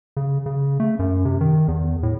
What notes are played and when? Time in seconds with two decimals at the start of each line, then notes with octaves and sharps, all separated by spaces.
0.17 C#3
0.46 C#3
0.80 A3
0.99 F#2
1.25 C3
1.41 D#3
1.68 E2
2.03 A2